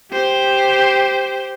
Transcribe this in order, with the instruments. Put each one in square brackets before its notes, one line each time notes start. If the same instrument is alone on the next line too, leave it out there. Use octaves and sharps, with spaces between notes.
[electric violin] G4 C5